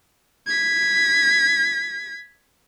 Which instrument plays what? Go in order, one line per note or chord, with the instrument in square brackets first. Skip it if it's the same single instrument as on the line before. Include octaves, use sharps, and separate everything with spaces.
[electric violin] G#6 B6